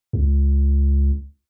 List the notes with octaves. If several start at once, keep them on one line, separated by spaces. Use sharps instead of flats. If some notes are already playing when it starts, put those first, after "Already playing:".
C#2